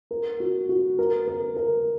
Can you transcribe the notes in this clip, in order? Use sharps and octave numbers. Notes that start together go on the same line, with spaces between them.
A#4
F#4
F#4
A#4
A#4
A#4